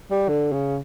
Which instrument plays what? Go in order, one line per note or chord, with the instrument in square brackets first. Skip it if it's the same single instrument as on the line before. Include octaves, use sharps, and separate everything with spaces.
[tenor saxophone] G3
D3
C#3